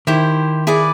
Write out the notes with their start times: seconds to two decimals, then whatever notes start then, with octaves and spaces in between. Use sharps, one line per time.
0.07 D#3 E4 G4 C5
0.67 E4 G#4 B4 D5